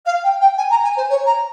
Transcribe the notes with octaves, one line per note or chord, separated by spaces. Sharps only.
F5
G5
G5
G#5
A#5
G#5
C5
C#5
A#5